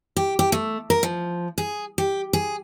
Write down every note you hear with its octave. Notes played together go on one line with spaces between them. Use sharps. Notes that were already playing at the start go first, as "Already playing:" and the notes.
G4
G4
A3
A#4
F3
G#4
G4
G#4